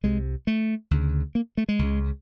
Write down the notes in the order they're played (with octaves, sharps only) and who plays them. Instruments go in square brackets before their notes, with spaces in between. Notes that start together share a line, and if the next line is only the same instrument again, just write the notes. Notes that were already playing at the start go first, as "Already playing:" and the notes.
[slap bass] C2 C3 G#3
A3
D2 C#3
A#3
A3
G#3
C#2 C#3